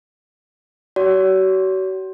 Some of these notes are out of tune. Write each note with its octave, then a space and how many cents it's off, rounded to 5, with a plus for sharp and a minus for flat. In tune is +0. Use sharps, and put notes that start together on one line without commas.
F#4 +40 C#5 +40